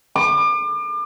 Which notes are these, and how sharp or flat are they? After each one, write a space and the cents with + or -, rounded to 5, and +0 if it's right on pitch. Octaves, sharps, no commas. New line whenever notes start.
D6 +35